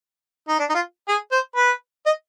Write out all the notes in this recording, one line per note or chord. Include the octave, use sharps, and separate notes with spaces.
D#4
D4
D#4
F4
G#4
C5
B4
D#5